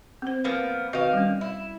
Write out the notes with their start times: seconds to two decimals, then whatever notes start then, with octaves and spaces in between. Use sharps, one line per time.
0.22 C4 C5
0.44 F3 A#3 B3
0.93 D#3 C4 F#4 B4 F5
1.13 G3 C#4
1.41 E4